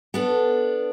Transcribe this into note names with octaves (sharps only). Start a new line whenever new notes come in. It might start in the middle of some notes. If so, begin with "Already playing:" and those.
B3 D4 A4